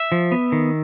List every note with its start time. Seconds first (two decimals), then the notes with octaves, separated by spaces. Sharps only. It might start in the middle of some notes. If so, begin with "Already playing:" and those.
Already playing: E5
0.12 F3
0.32 B3
0.52 D#3